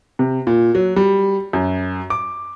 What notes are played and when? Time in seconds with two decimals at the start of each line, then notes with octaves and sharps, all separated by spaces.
0.19 C3
0.47 A#2
0.75 F#3
0.96 G3
1.53 F#2
2.10 D6